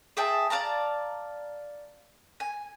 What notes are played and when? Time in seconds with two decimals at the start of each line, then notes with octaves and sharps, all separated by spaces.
0.17 G#4 E5 G5 A5
0.50 D5 F5 A5 A#5
2.40 G#5